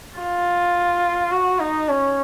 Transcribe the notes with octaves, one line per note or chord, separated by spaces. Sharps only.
F4
F#4
D#4
C#4